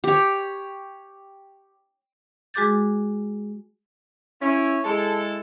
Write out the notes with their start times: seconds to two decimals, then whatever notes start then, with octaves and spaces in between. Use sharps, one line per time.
0.04 G4 C#5
2.54 G#3 F#4 G#4 D6 G6 A6
4.41 C#4 E4
4.83 G#3 E4 G#4 A4